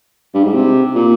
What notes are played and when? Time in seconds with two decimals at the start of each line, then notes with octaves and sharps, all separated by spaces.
0.34 G2
0.44 G#2
0.54 C3
0.95 A#2